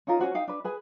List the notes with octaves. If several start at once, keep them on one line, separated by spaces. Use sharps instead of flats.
C#4 D#4 F4 A#4
C#4 D4 F#4 C5
D#4 F5 G5
D4 B4
G#4 B4 G#5